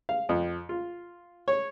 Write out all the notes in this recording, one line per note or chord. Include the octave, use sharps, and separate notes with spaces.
F5
F2
F4
C#5